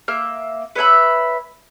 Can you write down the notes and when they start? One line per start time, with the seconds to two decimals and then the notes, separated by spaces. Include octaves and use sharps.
0.08 A#3 E5 F6
0.76 B4 C#5 E5 B5